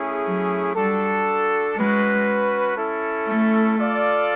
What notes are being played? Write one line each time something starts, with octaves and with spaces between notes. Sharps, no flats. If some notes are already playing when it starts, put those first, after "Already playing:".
Already playing: A3 C#4 E4 G#4
F#3
G3 D4 F#4 A4
G#3 C#4 F#4 B4
C#4 E4 A4
A3
F4 A4 D5 F5